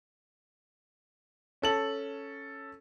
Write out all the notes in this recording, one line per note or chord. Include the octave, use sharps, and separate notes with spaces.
C#4 A4 F#7